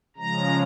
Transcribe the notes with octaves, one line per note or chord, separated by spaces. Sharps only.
C#3 F3 G#3 A#5